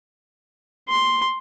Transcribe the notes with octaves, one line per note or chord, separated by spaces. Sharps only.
C6